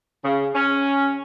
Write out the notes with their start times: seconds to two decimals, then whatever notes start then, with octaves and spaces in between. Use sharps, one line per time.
0.24 C#3
0.54 C#4